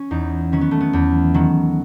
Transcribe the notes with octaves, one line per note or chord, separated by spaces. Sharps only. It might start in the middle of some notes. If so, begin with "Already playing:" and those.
Already playing: C#4
E2 D#4
D#3 F#3 C#4
B3
A3
B3
E2
D#3 F#3